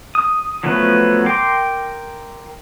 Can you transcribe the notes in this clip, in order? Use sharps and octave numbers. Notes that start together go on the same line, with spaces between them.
D#6
F3 F#3 A3 B3 B4
A#4 G5 C6 D6